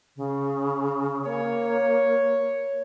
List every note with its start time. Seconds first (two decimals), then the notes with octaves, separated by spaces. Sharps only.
0.17 C#3
1.25 A#3 C#5